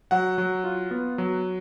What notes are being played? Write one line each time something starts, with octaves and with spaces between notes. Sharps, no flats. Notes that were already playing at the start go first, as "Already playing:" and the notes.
F#3 F#5
F#3
F4
B3
F#3